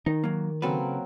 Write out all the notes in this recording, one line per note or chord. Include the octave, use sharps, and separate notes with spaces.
D#3 D#4
F#3 A#3
C#3 F#3 A#3 C4 A4 B4